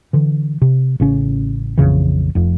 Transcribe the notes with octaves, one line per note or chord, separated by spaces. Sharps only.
D3 E3
C3
A1 C#3 C#4
A#1 F2 C#3 E3
F1 F2